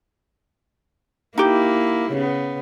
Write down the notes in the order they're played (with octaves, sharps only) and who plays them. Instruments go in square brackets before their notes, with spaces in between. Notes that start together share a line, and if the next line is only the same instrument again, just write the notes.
[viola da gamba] A#3 E4 [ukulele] D#4 G4
[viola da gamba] C#3 B3